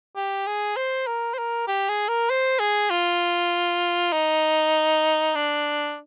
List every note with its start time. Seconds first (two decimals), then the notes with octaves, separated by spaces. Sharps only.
0.16 G4
0.47 G#4
0.76 C5
1.07 A#4
1.34 C5
1.38 A#4
1.68 G4
1.89 G#4
2.09 A#4
2.30 C5
2.59 G#4
2.90 F4
4.13 D#4
5.35 D4